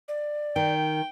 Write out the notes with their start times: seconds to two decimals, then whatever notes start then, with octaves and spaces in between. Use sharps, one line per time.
0.08 D5
0.56 D#3 G5